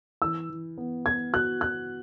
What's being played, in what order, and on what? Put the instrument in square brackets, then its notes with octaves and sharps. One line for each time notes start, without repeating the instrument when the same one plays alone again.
[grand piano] E3 [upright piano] E6
[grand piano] E3
B3
[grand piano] B3 [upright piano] G#6
[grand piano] F#4 [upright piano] F#6
[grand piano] F#4 [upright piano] F#6